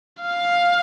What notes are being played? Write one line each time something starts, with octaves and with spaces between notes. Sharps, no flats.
F5